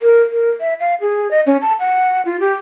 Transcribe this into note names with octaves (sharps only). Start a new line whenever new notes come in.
A#4
A#4
E5
F5
G#4
D#5
C#4
A5
F#5
F4
G4